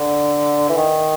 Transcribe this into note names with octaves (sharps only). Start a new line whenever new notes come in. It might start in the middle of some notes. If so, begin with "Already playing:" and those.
Already playing: D3
E3
D#3